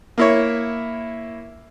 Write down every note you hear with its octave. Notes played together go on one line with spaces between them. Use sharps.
A#3 E4 C#5